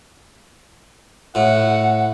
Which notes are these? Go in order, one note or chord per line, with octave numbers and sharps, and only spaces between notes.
A2 F#5